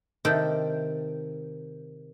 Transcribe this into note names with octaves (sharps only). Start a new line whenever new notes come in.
C3 D#3 A4 G5